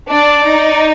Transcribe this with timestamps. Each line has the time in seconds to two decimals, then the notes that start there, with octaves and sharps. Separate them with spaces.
0.09 D4 D5
0.46 D#4